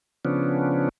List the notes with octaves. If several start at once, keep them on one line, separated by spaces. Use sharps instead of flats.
C#3 F3 B3 C#4 D4